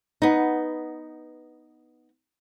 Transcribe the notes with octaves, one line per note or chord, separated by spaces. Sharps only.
B3 D#4